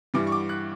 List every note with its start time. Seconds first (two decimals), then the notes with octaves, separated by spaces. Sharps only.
0.14 G2 E3 G3 D6
0.27 C#6
0.32 D6
0.49 F#6